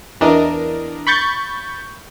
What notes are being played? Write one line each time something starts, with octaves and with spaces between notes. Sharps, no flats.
E2 E3 D4 A#4 D#5
B5 C#6 G6 A6